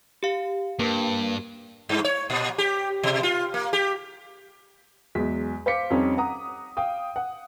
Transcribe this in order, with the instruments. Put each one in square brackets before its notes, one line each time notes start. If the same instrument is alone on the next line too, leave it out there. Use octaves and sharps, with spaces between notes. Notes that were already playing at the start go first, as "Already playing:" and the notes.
[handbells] G4 F5
[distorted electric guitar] G2 [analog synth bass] A#3 [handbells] A#4 B4
[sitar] G2
C#5
A#2
G4
B2
F4
A#3
G4
[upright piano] E2 F#3 G#3 B6
C5 F5 D6 B6 C#7
F2 G3 C4 C#4 D#4
F#5 A#5 D#6
F5 G5 D#6
F#5